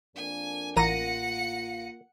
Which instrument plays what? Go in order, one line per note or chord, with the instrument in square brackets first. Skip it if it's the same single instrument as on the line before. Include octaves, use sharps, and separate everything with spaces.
[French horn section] F2 A#3 D4 [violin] G#5
[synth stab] A1 A#6 D#7 [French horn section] A#3 F4 [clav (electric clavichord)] A#4 [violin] F#5 C#7